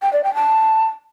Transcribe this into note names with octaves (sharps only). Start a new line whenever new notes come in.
G5
D5
G5
A5